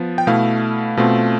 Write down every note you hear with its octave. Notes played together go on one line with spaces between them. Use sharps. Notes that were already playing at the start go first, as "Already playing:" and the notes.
Already playing: F3 B3
G5
B2 A3 E4 F5
B2 A3 C4 F4